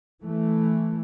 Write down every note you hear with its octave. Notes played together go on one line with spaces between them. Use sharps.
E3 A3